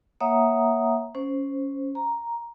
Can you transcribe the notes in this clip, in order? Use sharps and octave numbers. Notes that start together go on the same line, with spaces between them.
A#3 C#5 E5 F#5 A#5 D#6
C#4 C5
A#5